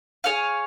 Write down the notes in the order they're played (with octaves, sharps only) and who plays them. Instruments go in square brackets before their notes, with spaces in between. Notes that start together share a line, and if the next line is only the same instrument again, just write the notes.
[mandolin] G#4 C#5 F5